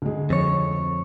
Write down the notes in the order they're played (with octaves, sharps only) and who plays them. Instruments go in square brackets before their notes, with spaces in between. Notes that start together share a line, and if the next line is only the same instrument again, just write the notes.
[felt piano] D2 G#3
[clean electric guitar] F2 C#5